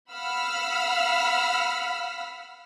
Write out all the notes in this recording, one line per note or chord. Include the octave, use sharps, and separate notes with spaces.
F5 F#5 B5 E6 F6 B6